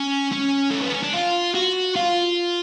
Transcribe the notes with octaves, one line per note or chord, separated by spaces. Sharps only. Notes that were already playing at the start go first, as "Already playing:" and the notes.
Already playing: C#4
C#4
A3
B3
C#4
D4
F4
F#4
F4